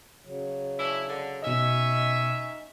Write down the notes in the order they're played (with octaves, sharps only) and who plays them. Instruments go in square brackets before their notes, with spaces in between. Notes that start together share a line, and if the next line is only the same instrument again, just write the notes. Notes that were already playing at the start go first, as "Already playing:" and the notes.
[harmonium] C#3 F#3
[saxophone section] C#4 D4 E4
D3
[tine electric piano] B2 D#5 [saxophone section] C#4 E5 [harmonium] D#4